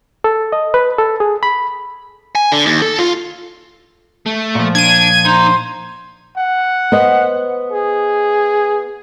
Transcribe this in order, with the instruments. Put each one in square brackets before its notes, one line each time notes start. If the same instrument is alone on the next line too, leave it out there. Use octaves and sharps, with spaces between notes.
[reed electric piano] A4
D#5
B4
A4
G#4
B5
[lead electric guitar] G#5
D3
D#2
A4
F4
[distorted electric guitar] A3
[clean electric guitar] A#2 F3
[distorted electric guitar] D4 [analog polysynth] G#6 D#7
[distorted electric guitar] D#4 A#5 [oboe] C5
[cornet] F#5
[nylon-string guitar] B3 C5 D#5
[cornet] G#4